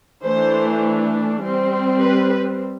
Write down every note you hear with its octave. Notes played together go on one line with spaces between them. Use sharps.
E3 A3 D4 C5
G3 C4
B4